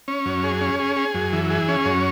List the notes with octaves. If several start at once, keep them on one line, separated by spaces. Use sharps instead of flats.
C#4
F#2
G#4
C#4
G#4
G#4
F#2
E3
G#4
C#4
F#2